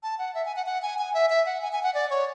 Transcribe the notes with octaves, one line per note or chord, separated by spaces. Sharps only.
A5
F#5
E5
G#5
F#5
F#5
G#5
G#5
E5
E5
F#5
G#5
G#5
F#5
D5
C#5